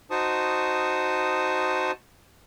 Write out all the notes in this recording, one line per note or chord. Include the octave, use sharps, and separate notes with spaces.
D#4 F#4 C5 A5 C#6 D#6